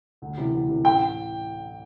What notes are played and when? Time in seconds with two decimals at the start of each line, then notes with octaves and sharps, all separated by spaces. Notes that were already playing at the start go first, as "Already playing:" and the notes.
0.22 D2
0.37 C3 E3
0.53 D2
0.68 C3 E3
0.85 A1 G5